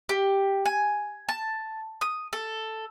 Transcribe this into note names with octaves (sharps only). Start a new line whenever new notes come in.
G4
G#5
A5
D#6
A4